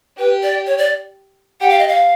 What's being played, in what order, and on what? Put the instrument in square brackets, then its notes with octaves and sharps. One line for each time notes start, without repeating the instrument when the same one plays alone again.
[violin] G4 [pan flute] B4
[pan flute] D5
C#5
D5
[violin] G4 [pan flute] F#5
[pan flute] F5
D#5
F5